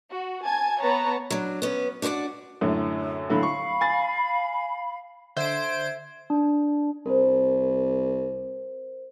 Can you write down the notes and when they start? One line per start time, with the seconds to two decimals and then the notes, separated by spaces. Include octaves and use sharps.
0.13 F#4
0.44 G#5 A5 G#6
0.81 B3 B4 C#5 A5 A#5
1.30 F#3 D4
1.62 B3 C#4
2.02 D4 F#4 C5 D5 F#5
2.61 F#2 A2 D3
3.30 A2 D3 F#3 F5 B5
3.43 C#6
3.81 G#5 A6
5.37 D3 C5 E5 G#6 D7
6.30 D4
7.06 C2 A#4 C5